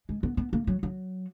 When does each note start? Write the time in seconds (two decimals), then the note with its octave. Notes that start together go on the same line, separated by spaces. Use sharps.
0.09 G#3
0.23 B3
0.37 B3
0.53 A#3
0.67 F#3
0.83 F#3